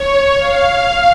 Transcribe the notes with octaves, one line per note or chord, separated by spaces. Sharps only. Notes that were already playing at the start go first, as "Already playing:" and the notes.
Already playing: C#5
F5